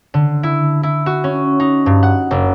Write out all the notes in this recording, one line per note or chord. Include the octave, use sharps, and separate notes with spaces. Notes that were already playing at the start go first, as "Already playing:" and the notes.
D3
E4
E4
F#4
C#4
D#4
G2
F#5
F#1